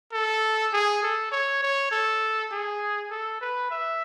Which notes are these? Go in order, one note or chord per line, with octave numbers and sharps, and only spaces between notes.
A4
G#4
A4
C#5
C#5
A4
G#4
A4
B4
E5